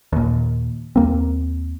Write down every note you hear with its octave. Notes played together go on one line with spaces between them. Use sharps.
D#2 A#2
D#2 A#3 C4